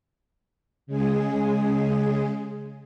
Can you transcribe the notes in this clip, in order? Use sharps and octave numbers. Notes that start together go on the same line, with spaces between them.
C#3 G#3 G#4